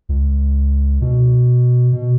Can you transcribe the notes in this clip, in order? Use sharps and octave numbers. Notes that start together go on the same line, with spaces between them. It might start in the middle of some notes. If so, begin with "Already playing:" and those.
C#2
B2
B2